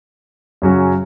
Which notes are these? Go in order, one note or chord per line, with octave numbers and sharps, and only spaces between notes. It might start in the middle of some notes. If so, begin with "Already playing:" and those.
F#2 C#3 F#3 C#4 F#4